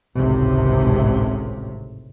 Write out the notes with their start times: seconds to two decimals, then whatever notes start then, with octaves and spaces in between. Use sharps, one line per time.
0.18 G#1 C#2 A2 C3